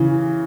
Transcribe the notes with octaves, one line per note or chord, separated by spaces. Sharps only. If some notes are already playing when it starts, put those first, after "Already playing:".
Already playing: C#3 E3